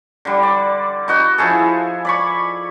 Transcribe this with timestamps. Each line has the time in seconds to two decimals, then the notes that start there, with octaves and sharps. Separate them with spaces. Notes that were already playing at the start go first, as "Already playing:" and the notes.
0.25 D3 G3
0.43 D5
1.08 D#4 F#4 D#5
1.38 F3 E4 G#4 A4
2.05 D5 B5 C#6